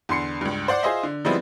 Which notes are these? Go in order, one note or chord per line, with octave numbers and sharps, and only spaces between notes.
E2 D3 C6 C7 C#7
C#2 G2
C5 D5 F#5 D6
F4 G#4 C5 D#5 E5
D3
F3 G3 G#3 B3 C4 E4